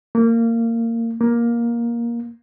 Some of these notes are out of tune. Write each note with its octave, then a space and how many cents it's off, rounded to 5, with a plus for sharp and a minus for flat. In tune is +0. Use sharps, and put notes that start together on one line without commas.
A#3 -20
A#3 +15